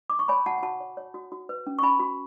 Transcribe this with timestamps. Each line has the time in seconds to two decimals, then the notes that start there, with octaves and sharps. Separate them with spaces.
0.10 D6
0.19 C#6
0.28 C#5 G#5 B5
0.46 F#4 F#5 A5
0.58 G#5
0.63 F#4 F#5 A5
0.80 C#5
0.97 C#5
1.14 F#4
1.32 F#4
1.49 B4
1.67 C#4
1.79 C#6
1.82 C#4 G#5 B5
2.00 F#4